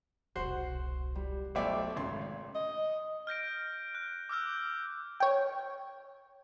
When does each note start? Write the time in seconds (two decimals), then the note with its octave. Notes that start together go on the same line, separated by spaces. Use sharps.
0.36 E1 C2 F#4 C5
1.15 G3
1.55 B1 C3 A3 C5 D5 E5 G5
1.96 G#1 C#4 C6
2.55 D#5
3.27 F6 G6 A#6 D7
3.95 F#6
4.29 D6 E6 F6 G6
5.20 C#5 G5